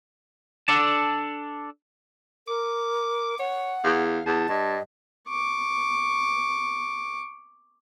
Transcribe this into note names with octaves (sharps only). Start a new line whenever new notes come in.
D4 A4 D5 A5
A#4 D6
C#5 F#5
E2 F5
E2 A5
G2 D#5
C#6 D6